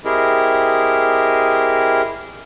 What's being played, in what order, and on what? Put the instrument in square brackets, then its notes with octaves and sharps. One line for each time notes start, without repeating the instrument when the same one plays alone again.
[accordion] C4 E4 G4 G#4 A#4 D#5